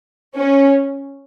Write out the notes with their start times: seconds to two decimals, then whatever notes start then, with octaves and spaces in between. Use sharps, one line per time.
0.36 C#4